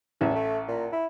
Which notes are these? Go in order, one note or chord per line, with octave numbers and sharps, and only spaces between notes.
A1 E2 E5
A3
A#2
E4